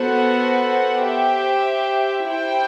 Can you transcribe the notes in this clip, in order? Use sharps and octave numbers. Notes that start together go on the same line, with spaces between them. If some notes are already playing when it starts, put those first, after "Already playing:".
Already playing: B3 F#4 A4 C5 F#5
G4 C5 E5
E4 G4 C5 G5